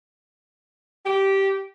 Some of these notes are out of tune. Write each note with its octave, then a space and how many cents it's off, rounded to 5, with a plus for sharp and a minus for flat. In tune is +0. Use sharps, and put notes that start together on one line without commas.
G4 -10